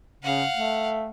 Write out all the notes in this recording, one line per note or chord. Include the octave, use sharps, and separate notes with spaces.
C#3 F5 F#5
A3